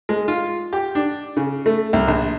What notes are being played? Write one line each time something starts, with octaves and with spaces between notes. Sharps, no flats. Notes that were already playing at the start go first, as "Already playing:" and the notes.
G#3
F4
G4
D4
C#3
A3
C2
A#1